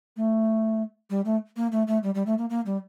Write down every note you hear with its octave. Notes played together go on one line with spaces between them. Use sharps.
A3
G3
A3
A#3
A3
A3
G3
G3
A3
A#3
A#3
G3